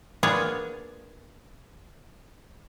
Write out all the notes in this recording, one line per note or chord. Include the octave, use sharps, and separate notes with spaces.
A#3 B3 D4 F4 G#4 C#5